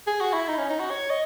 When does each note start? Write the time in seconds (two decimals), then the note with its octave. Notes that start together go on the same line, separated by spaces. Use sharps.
0.07 G#4
0.21 F#4
0.34 E4
0.48 D#4
0.58 C#4
0.69 D#4
0.80 F#4
0.91 C#5
1.10 D#5